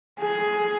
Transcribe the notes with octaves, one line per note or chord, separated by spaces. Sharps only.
G#4